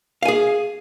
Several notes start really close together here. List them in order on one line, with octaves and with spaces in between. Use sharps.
F5 G#5 G#4